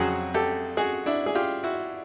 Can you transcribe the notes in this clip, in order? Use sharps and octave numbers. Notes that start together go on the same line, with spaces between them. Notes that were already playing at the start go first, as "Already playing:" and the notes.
Already playing: F2 C#3 F#3 F#4 G#4
G4 A4
F#4 G#4
D4 E4
G#4
F4 G4
E4 F#4